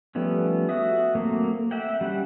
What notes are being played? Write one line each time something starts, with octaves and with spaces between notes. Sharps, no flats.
F3 G3 A3 B3 C#4
F#4 E5 D#6
F#3 A3 A#3 C4
E5 F#5 G5
G3 C#4 F#5